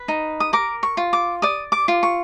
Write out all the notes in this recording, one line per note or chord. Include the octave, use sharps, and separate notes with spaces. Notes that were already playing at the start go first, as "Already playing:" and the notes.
Already playing: B4
D#4
D#6
A#4 D6
C#6
F4
D6
D5 D#6
D6
F4
C#6